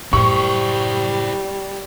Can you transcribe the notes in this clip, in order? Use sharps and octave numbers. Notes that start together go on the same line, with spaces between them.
F#2 A2 G3 E4 C5 C#6